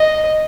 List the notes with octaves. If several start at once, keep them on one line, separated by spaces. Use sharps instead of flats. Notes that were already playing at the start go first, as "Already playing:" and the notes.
Already playing: D#5